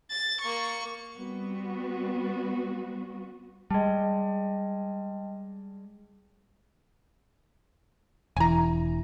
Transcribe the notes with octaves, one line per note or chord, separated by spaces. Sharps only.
A6
A#3 C#6
G3 B3 C4 F#4
G3 G#3 D#5 G5 A5
E1 E3 G#5 A#5